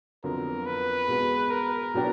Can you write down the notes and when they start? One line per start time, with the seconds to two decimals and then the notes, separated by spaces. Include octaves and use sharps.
0.24 F2 D3 F#3 B3 A#4
0.66 B4
1.08 B2 G#3 B3
1.50 A#4
1.94 B2 F#3 B3 D4 G4